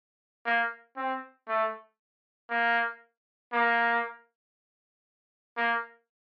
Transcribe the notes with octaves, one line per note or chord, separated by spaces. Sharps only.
A#3
C4
A3
A#3
A#3
A#3